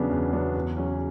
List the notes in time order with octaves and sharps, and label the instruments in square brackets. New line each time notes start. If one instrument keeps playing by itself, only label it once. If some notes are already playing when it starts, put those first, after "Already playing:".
Already playing: [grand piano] E2 C#3 F#3 B3 D4
E2
C#3 F#3 B3 D4
E2
C#3 F#3 C#4